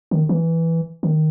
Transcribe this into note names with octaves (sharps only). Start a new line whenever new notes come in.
D#3
E3
D#3